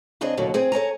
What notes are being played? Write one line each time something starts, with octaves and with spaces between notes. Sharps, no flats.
C#3 C4 D4 G#4 D#5
D#2 B2 D3 F#3 A#3
C4 G#4 C5 G#5
A4 C#5 G#5 A#5